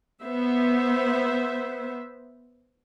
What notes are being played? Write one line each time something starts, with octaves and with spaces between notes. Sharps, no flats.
B3 C5 E5